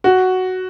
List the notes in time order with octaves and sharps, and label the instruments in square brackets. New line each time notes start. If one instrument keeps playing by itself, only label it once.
[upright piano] F#4